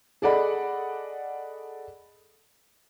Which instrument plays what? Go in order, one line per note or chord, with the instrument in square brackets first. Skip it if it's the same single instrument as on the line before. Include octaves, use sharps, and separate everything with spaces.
[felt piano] G#4 A4 D5 D#5 F#5 B5